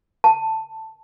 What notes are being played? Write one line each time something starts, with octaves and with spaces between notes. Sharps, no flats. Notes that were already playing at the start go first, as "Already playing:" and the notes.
A5